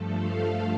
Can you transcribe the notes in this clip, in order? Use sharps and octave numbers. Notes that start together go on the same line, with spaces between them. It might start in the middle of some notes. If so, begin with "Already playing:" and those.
Already playing: G2 F3 A3 A4
F5